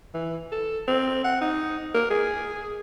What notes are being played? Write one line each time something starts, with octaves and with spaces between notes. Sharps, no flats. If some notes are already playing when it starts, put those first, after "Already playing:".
E3
A4
C4
F#5
D#4
A#4
G#4